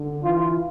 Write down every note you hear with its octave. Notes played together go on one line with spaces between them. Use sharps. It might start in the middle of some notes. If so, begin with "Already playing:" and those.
Already playing: D3
E3 F4